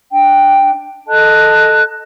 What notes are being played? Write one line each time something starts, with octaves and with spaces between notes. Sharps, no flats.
D4 G5
A4 D#5 A5 F#6